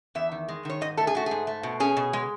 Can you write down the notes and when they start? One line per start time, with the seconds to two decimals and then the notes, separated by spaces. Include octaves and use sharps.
0.15 E2 E5
0.32 D#3
0.48 G#3
0.65 D#3 C#5
0.81 G#2 D#5
0.97 A3 A4
1.07 G#4
1.15 A3 F#4
1.26 G#2 G#4
1.47 A3
1.63 B2
1.80 C#4 G#4
1.97 B2
2.13 G#3